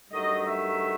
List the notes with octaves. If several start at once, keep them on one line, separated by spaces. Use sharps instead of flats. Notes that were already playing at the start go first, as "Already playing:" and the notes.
G2 D#3 F#3 A3 D#5
E5